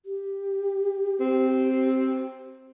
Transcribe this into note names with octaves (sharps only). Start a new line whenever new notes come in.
G4
C4